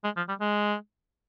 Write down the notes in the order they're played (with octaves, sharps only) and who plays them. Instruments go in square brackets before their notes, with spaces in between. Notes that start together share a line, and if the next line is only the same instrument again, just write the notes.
[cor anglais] G#3
F3
G3
G#3